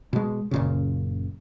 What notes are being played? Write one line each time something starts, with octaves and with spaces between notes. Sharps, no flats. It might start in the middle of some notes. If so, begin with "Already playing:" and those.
B2 G#3
F#1 A#2 C#3